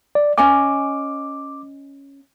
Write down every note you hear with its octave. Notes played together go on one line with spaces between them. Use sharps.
D5
C#4 D#5 G#5 D6